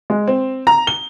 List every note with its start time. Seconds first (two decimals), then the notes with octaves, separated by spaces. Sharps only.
0.10 G#3
0.28 C4
0.67 A#5
0.87 G7